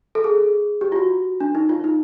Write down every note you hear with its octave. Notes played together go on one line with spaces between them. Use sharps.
A4
G#4
G4
F4
F#4
D4
D#4
F4
D#4